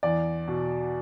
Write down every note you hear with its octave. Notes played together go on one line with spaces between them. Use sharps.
E2 D5
B2